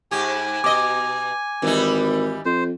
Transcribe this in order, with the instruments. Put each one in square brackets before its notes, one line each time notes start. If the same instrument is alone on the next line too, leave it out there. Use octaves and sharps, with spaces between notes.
[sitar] G#2 G4 [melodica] G#5
[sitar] B2 D#5 [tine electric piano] D6
[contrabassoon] G#1 [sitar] E3 G3 D#4
[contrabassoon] F2 [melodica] C5